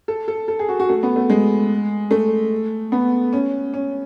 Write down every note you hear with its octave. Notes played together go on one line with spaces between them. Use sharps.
A4
A4
A4
G#4
F#4
F#4
A3
B3
A3
G#3
A3
B3
C#4
C#4